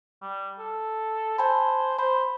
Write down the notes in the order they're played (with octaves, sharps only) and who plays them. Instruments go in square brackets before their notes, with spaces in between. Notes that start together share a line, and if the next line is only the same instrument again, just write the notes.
[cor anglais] G3
A4
[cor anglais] C5 [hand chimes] G#5 A5 B5
[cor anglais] C5 [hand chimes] B5